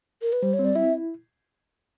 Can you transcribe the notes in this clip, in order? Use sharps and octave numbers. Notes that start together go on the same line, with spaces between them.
A#4
B4
G3 C5
C#5
C4
D5
E4 E5